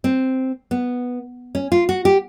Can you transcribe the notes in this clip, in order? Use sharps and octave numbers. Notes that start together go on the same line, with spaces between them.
C4
B3
C#4
F4
F#4
G4